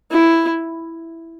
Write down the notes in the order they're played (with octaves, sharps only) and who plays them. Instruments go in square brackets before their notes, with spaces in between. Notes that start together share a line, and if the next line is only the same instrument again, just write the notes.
[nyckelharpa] E4